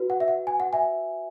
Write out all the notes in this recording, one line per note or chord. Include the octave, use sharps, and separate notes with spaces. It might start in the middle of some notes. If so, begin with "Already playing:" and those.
Already playing: F#4 B4
F#5
E5
F#5
G#5
F#5
E5 G#5